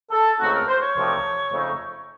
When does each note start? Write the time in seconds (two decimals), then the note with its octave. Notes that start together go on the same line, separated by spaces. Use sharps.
0.12 A4
0.40 C#2 C#3 A3 C4 D#4 F#4
0.54 A#4
0.68 C5
0.82 C#5
0.96 C2 C3 F3 A3 D#4
1.51 F2 C#3 A3 D#4